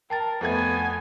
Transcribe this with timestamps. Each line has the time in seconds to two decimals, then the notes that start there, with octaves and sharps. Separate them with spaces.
0.10 A#4 G5 A5 A6
0.41 F2 A3 B3 G#5 G#6